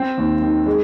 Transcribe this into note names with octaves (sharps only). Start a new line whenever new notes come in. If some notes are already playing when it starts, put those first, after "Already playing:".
Already playing: C4
D#2
D#3
G#3